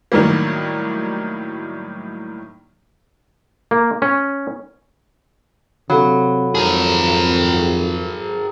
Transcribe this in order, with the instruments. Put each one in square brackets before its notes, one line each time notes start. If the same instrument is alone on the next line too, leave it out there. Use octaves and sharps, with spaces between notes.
[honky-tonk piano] A2 D#3 F#3 G3 A#3
[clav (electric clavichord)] A#3
C#4
[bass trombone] C3 [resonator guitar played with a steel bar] F#3 [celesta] A4 F5 B5
[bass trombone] F2 [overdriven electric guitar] G#4 A#4